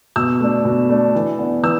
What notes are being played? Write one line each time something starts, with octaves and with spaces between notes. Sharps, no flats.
B2 E6
A3 D4
B2
A3 D4
E3
B3 D4
E3 E6